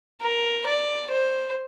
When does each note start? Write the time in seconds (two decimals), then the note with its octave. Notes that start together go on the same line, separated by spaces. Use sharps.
0.21 A#4
0.67 D5
1.11 C5